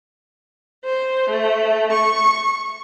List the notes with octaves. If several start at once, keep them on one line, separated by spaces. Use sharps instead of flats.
C5
A3
C#6